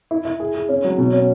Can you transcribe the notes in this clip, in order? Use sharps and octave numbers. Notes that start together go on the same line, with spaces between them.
E4
E4
G#4
G#4
C#4
F#3
B2
C#4